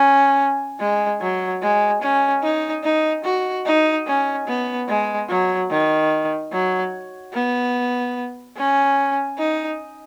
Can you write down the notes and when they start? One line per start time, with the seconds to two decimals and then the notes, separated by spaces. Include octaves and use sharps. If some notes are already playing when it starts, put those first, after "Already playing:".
Already playing: C#4
0.80 G#3
1.21 F#3
1.62 G#3
2.02 C#4
2.43 D#4
2.84 D#4
3.24 F#4
3.66 D#4
4.07 C#4
4.47 B3
4.88 G#3
5.29 F#3
5.70 D#3
6.52 F#3
7.33 B3
8.57 C#4
9.38 D#4